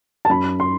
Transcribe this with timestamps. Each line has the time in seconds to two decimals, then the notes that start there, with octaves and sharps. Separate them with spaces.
0.25 A5
0.29 F#2 B5
0.60 C6